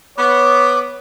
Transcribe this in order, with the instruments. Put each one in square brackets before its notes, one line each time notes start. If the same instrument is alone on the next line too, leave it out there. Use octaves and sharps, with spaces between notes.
[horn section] B3 [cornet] C#5 [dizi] D6